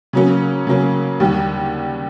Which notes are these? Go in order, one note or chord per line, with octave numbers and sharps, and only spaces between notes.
C#3 F#3 A#3 C#4
C#3 F#3 A#3 C#4
D#2 D3 G3